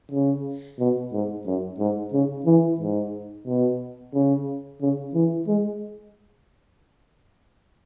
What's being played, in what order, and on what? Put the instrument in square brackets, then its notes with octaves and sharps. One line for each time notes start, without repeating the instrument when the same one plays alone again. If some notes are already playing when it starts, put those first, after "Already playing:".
[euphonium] C#3
B2
G#2
F#2
G#2
C#3
E3
G#2
B2
C#3
C#3
E3
G#3